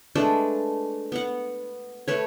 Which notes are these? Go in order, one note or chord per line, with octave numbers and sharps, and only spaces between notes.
G#3 A3 D4 B4
B3 F#5
A3 B4 C#5